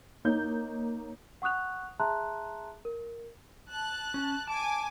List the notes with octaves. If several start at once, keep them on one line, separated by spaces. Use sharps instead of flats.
A#3 D#4 C#5 G6
F#5 C#6 D#6 F#6 F7
G#4 E5 A5 A#5 C6 F#6
A#4
A5 F#6
C#4
G#5 A5 D6